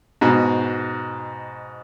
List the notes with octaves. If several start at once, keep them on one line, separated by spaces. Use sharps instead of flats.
G#2 B2